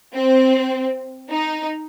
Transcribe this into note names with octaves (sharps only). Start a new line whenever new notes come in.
C4
D#4